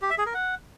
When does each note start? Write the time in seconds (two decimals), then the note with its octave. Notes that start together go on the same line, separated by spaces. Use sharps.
0.02 G4
0.10 E5
0.18 G#4
0.26 A#4
0.34 F#5